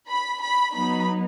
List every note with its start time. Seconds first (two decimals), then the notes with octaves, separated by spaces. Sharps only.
0.09 B5
0.43 B5
0.75 F#3 B3 D#4 B5